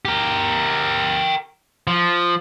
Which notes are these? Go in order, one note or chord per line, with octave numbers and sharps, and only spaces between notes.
G4 A#4
F3